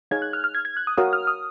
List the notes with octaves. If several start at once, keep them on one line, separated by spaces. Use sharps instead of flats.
D#4 G#4 C#5 F5 G#6
F#6
F6
F6
G#6
G#6
F#6
D#6
F#4 A#4 C#5 F5 D#6
F6
D#6